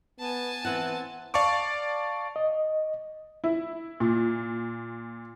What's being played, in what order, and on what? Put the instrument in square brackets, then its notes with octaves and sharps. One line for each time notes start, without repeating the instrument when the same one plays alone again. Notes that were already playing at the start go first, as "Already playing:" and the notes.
[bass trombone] B3 [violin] G#5 A5
[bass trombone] E3 [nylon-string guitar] B3 C4 F#5
[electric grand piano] D5 F5 A5 C#6 D6
[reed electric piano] D#5
[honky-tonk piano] E4
A#2